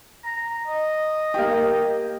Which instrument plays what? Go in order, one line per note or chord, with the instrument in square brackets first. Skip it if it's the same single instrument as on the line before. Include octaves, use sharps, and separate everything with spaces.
[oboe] A#5
D#5
[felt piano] A#3 G4